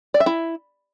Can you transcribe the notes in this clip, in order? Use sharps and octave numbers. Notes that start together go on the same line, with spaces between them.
D5
E5
E4